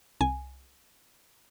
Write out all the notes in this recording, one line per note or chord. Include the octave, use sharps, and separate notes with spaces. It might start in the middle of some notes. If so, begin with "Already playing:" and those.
C2 G#5